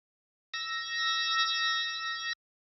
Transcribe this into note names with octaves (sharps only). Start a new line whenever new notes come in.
E6 A#6